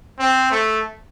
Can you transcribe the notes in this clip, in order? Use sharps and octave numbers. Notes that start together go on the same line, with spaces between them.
C4
A3